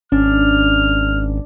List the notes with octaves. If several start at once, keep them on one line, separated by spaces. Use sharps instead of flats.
G#1 C#4 D4 F6